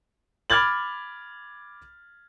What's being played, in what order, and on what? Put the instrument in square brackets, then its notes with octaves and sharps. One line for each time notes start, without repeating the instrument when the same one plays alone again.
[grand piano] B5 D6 F6 G#6 A6 F#7